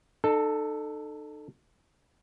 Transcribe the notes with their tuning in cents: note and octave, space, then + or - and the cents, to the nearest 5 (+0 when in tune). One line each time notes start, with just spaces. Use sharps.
D#4 -40 A4 +0